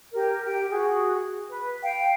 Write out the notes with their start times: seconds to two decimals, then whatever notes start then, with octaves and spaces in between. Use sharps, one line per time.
0.14 G4 A#4
0.45 G4 G5
0.72 F#4 G#4
1.49 B4
1.82 F5 G5